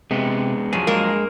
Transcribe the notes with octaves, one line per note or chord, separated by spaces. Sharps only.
C3 G#3 B3
F#2 F3 F#3 G#4
G2 G#3 A#3 A#4